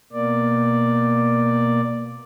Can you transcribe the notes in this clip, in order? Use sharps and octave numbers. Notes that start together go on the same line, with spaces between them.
B2 A#3 D5